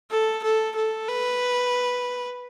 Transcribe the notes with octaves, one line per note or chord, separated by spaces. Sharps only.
A4
A4
A4
B4